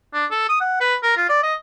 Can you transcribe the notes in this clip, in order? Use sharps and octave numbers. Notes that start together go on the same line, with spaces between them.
D4
A4
D#6
F#5
B4
A#4
F4
D5
D#5